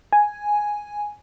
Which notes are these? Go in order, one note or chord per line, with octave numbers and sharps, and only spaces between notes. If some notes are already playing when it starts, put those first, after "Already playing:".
G#5